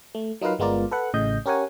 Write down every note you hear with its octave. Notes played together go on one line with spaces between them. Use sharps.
A3
F#3 D#4 F4 A#4 B4 F5
G1 G#3 B3 F4 A#4 D5
A4 B4 F#5 F#6
A1 A2 C#3 D#5 G6
C#4 G4 A#4 C#5 F#5 G#5